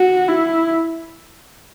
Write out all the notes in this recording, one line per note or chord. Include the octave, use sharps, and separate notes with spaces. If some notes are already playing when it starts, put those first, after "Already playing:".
Already playing: F#4
E4